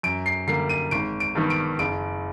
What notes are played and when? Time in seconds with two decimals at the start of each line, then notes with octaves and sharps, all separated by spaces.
0.03 F#2 D7
0.26 C7
0.47 D3 G3 A#3 C7
0.69 D#7
0.91 G#1 D7
1.20 D7
1.35 G2 D#3 G3 B3
1.50 D7
1.79 F#1 D7